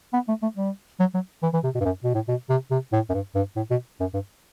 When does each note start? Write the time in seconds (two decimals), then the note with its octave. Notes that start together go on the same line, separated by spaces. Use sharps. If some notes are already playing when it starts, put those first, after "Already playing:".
0.13 B3
0.28 A3
0.42 A3
0.57 G3
1.00 F#3
1.14 F#3
1.43 E3
1.54 E3
1.64 C3
1.75 B2
1.80 G2
1.85 F#2
2.04 B2
2.14 A2
2.28 B2
2.49 C3
2.71 C3
2.93 A2
3.10 F#2
3.14 G2
3.35 G2
3.56 A2
3.71 B2
4.00 F#2
4.14 G2